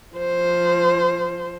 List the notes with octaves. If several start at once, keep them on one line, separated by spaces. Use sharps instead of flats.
F3 C5